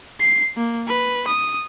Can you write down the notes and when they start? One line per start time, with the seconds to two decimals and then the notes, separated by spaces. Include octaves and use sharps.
0.21 C7
0.57 A#3
0.88 B4
1.27 D#6